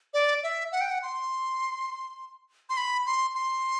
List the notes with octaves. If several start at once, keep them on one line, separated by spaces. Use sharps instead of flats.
D5
E5
F#5
G5
F#5
C6
C6
B5
C6
C6